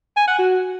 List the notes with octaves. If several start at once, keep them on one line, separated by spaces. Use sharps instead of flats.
G#5
F#5
F#4